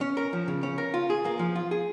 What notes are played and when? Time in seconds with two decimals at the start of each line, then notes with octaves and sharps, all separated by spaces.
0.01 C#4
0.17 A#4
0.33 F3
0.48 C#3
0.63 C#4
0.78 A#4
0.94 F4
1.10 G#4
1.25 A#3
1.39 F3
1.56 F4
1.71 G#4